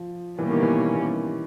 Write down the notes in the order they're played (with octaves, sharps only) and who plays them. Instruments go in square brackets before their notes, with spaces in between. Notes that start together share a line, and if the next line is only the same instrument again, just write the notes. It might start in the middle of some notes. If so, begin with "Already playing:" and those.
Already playing: [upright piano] F3
[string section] B2 G3 A#3 C#4 [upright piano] E3
[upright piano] D#3
E3